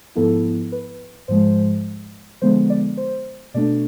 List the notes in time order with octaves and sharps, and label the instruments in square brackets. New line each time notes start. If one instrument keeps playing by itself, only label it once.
[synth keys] G#2 F3 B3 E4 A4
B4
G#2 F3 G#3 C5
D3 F3 G#3 B3 C5
D5
C5
B2 A3 D4 D5